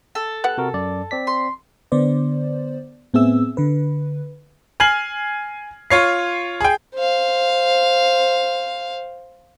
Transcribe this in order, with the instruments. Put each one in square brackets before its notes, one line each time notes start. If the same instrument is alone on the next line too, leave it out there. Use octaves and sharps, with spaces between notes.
[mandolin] A4
[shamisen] B3 G4 F#5 [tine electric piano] F#6
[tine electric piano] C3 F#4 A#4
F#2 D5
C4 D5 B6
[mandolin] C6
[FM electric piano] D3 B3 C5 D5
A2 B3 C4 G#4 E5 E6
D3 B4
[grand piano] G#5 F6 G#6 C7 F#7
F4 C#5 C7
G#4 G5
[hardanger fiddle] C5 F5